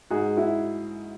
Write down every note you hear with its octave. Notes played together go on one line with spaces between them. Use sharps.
G#2 F#4 G#4
E4 F#4